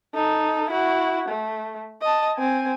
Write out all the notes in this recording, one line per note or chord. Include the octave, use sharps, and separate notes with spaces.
D#4 A4
E4 F#4
A3
D#5 A5
C4 G#5